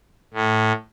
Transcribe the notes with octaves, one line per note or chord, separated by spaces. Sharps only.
A2